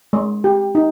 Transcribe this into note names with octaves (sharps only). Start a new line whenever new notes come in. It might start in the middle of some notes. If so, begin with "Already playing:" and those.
G#3
G4
D#4